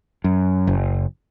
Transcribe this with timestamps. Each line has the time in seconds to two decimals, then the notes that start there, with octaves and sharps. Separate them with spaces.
0.24 F#2
0.67 F#1